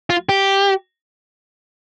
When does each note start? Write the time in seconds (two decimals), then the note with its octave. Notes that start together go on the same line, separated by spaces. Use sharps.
0.10 F4
0.29 G4